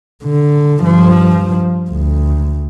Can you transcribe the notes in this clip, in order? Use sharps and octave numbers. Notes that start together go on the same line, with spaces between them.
D3
G2 F3
D2